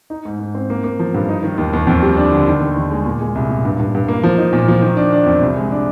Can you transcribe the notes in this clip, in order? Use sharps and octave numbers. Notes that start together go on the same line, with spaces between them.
D#4
G#2
G#2
C4
A#3
A#3
F3
G2
D#4
D#3
D#2
D#2
F2
G3
D4
D3
D#3
D#2
D#2
G#3
A#2
G#3
C2
A#2
G2
G2
G2
A#3
F3
D#4
A#2
F3
D#3
D4
D4
F2
C2
G#3
D4